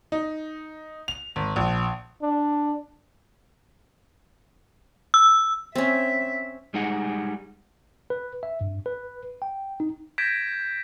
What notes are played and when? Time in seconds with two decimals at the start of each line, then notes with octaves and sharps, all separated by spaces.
0.12 D#4
1.08 F7
1.36 G#1
1.56 A#1
2.22 D4
5.14 E6
5.75 C4 C#4 E5
6.74 G3 G#3 D#4 G#4 F#5
8.10 B4
8.43 E5
8.61 G2
8.86 B4
9.42 G5
9.80 D#4
10.18 G6 G#6 A#6 B6 D7 E7